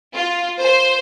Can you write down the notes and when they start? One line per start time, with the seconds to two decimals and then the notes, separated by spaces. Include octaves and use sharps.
0.15 F4
0.61 C5